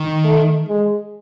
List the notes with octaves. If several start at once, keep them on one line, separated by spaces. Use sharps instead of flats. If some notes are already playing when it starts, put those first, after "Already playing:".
Already playing: D#3
A3
G#3